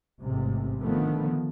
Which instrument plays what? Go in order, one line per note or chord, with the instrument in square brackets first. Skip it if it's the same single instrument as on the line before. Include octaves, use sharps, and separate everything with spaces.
[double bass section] A1 G#2 C3
D3 D#3 F3 A3 B3